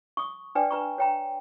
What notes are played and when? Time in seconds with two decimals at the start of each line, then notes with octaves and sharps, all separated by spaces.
0.17 C#6 D#6
0.55 D4 B4 D5 G5 G#5
0.71 B4 A#5 C#6
0.98 C#5 G5 A#5